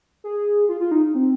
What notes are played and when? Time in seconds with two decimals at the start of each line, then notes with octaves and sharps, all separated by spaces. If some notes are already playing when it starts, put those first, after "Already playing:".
0.24 G#4
0.69 F4
0.80 F4
0.91 D#4
1.14 C4